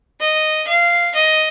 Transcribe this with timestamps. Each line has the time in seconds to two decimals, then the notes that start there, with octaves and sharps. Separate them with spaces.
0.20 D#5
0.67 F5
1.15 D#5